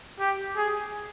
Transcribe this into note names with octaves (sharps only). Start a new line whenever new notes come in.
G4
G#4